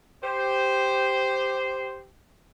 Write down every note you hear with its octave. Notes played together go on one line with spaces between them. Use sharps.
G4 C5